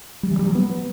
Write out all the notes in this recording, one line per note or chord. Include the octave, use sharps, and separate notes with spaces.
G3
E3
G3
F#3
B3